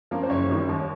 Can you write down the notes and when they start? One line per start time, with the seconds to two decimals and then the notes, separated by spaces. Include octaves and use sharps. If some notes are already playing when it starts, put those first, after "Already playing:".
0.11 F3 A#3 C#4
0.23 C5
0.30 F#1 C#5
0.49 F#2 D#3 G3
0.69 D#2